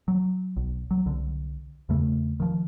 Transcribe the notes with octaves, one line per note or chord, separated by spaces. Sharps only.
F#3
B1
F#3
C2 D3
E2 C#3 A3
D#3 F3